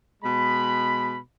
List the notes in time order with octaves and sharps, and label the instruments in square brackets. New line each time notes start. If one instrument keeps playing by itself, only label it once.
[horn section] B2 G#3 B5